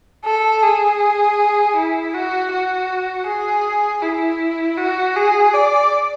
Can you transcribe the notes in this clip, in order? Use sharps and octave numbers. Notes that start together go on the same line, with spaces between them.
A4
G#4
E4
F#4
F#4
G#4
E4
F#4
G#4
D5